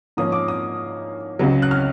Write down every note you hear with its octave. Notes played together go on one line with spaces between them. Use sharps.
G#2 F3 A#3 C#4 D#6
D6
D#6
C#2 C#3 F#3
F#6
F6